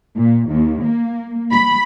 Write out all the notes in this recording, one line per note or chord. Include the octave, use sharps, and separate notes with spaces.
A#2
D#2
A#3
B5